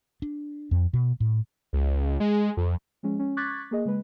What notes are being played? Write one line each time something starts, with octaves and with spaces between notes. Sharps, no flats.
D4
F2
B2
A2
C#2
G#3
F2
F3 G#3 C#4
C#4
C#6 D6 F#6 G#6 A6 B6
A#3 G#4 D#5
C#3 G#3 B4